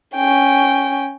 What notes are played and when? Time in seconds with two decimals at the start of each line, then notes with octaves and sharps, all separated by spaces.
0.16 C#4 G5